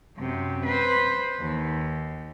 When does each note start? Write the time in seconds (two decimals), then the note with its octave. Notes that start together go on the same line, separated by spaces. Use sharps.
0.17 F#2 C3
0.65 B4 C5
1.40 D#2